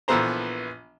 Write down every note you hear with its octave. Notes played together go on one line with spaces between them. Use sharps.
A#1 E3 B3 A4 C5 A#5